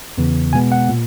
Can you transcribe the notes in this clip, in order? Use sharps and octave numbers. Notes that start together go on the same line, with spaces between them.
E2 C#3 E3 B3
B2 G#3 B3 G#5
F#5
A#2